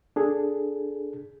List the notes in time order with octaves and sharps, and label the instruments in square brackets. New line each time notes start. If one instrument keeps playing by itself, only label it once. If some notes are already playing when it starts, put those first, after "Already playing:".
[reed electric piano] D4 G#4 A4